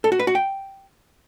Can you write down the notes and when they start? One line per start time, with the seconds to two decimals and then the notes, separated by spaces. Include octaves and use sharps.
0.04 A4
0.12 F#4
0.19 B4
0.27 F#4
0.35 G5